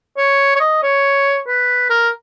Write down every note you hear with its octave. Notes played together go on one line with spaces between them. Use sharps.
C#5
C#5
D#5
C#5
B4
A#4